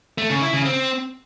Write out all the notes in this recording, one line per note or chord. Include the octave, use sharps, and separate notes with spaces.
A3
C#3
E4
C#3
C4